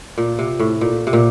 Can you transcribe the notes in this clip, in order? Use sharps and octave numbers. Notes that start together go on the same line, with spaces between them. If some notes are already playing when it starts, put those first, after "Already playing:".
A#2
C3
A2
A#2
C3
A#2